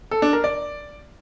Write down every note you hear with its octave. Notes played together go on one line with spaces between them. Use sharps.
A4
D4
A#4
D5